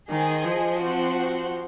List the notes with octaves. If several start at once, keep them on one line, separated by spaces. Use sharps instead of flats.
D#3 G#4 C5 D#5
F3
C4 F#4 C5 F#5